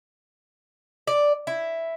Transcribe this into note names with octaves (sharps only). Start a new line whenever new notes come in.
D5
E4